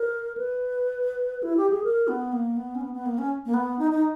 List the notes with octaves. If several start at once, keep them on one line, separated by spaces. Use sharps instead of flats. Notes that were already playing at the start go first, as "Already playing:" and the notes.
Already playing: A#4
B4
E4
G4
G#4
A#4
B3
A#3
B3
C#4
B3
B3
A#3
C#4
A#3
B3
D#4
D#4